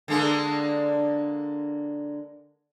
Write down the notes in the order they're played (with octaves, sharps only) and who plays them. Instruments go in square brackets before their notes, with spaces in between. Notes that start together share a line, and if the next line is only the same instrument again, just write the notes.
[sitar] D3 G#3 A#3